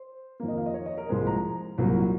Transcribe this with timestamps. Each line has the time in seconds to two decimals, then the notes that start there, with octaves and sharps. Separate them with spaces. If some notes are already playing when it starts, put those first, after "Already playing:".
Already playing: C5
0.40 F2 D#3 A#3
0.48 D#5
0.58 F5
0.66 D#5
0.74 C#5
0.86 D#5
0.97 A#4
1.09 C2 A#2 F3 G#3 C5
1.27 A#5
1.78 C2 A#2 F#3 A#3